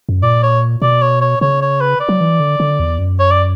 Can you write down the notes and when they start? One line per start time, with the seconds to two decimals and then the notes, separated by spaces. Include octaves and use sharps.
0.09 F#2
0.23 A#2 D5
0.43 C#5
0.82 B2 D5
1.02 C#5
1.21 C#5
1.41 C#3 C#5
1.61 C#5
1.81 B4
2.00 D5
2.09 F#3
2.21 E3
2.40 D3
2.60 D3
2.80 E2
2.99 F#2
3.19 C#5
3.31 D5